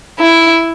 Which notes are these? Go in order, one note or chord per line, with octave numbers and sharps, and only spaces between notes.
E4